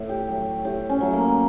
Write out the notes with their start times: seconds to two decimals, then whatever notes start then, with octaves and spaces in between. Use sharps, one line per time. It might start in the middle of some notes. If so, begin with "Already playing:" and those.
Already playing: A2
0.09 G4
0.28 F#3 A3 G4
0.65 A2 G4
0.89 C#4
1.01 F#3 A3
1.13 A#3